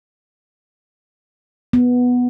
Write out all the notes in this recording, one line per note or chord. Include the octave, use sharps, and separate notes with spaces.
B3